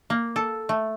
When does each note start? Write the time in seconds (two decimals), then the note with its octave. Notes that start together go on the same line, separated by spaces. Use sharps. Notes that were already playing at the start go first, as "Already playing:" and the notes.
0.10 A#3
0.36 A4
0.69 A3